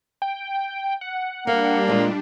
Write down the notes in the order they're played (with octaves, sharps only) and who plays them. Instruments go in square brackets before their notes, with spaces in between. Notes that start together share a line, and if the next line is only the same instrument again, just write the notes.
[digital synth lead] G5
F#5
[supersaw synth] G3 D4 [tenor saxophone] A#3 [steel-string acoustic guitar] F5
[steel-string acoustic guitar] A#2 G#3 F4